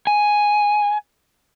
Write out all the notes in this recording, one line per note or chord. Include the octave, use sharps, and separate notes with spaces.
G#5